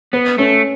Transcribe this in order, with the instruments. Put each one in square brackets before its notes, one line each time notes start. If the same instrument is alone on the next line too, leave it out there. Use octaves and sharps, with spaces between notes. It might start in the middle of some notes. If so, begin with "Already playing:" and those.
[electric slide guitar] B3 [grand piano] B4
[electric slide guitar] A3 [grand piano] C#4